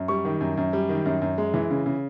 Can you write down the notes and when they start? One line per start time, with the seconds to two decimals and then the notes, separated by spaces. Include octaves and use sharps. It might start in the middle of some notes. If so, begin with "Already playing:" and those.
Already playing: F#2
0.08 G3 C#6
0.25 D#3
0.41 F#2
0.57 F#2
0.73 G3
0.89 D#3
1.05 F#2
1.22 F#2
1.38 G#3
1.54 E3
1.70 C#3
1.86 C#3